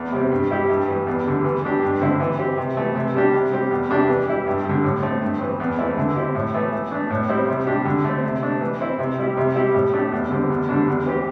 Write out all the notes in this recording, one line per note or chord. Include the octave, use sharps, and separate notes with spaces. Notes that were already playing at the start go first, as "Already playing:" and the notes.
Already playing: E2
C3 G3 C4
G2
G3 E4 G4
G2
E3 G3
E2
D3 G3
E3
G3 D4 G4
G2
D3 C4 E4
E3
C4 G4
C3
E3 A3
C3
G3 D4 G4
C3
G3 C4 G4
E2
C3 G3 D4 G4
E3
G3 E4 G4
G2
D3 G3
A2
A3 C4
G2
E3 C4
E2
E3 A3 C4 E4
D3
C4 E4 G4
A2
E3 A3
E3
A3 D4
A2
G3 C4 E4
C3
G3 D4 G4
D3
A3 C4
C3
A3 D4
E3
C4 E4
C3
G3 E4 G4
C3
G3 E4 G4
A2
A3 D4 G4
E2
D3 G3 C4
E2
D3 G3 D4
E2
E3 C4 G4